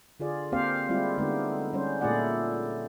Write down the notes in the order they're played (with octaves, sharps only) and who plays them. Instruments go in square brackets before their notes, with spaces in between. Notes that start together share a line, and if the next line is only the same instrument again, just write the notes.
[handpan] D3 F4 G#4 D5
A#3 C4 G4 C5 F5
G3 G#3 C4 E4 F4
D3 G#3 A3 B3 D#4 G4
G3 C#4 C5
A#2 A3 E4 G#4 D5 F#5